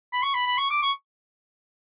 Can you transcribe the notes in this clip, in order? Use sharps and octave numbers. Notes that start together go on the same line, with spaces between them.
B5
C#6
B5
B5
C#6
D6
C#6